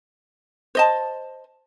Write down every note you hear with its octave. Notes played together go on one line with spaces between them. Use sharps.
C5 D#5 A5